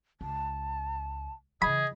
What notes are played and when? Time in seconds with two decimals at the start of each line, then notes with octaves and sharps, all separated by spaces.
0.21 C#2 A5
1.62 C#3 E3 G#4 D#5 B5